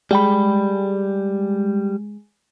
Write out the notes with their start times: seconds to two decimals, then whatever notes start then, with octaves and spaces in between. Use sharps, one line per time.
0.11 G3 G#3 G5 B5